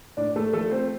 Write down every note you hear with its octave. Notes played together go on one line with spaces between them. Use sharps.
A2 D4 D5
A3 A4
F3 A3 A4
C4 C5